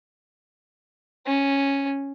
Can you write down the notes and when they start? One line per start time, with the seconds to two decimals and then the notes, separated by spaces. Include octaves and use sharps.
1.26 C#4